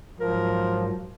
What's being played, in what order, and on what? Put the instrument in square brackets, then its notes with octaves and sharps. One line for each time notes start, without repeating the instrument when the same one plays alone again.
[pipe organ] G#2 F#3 [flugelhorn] F3 [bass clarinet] A#4